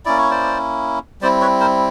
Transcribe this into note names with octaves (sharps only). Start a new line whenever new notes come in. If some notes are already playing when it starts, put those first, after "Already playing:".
A#3 C#4 E4 D5
C#5
C5 D5
G3 C4 E4 C5 D5
B4 C#5
A#4 C5